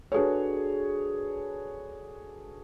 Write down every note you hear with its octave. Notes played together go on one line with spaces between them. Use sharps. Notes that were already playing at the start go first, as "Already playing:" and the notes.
D4 F#4 G#4 A4 B4 C#5